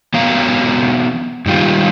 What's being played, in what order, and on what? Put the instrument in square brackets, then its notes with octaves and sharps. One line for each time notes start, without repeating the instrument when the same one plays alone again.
[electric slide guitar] E3 F#3 B3 C#5 F5 A#5
G2 D#3 G3 F4